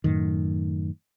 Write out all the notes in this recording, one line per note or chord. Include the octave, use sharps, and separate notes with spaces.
F#2 A2 D#3